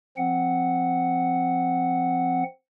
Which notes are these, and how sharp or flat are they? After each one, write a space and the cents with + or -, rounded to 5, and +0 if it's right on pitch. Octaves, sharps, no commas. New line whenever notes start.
F3 +0 C4 +0 F#5 +0